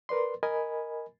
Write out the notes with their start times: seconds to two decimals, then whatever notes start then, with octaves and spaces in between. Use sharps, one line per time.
0.09 A#4 B4 D5 C6
0.43 A#4 D#5 G#5 B5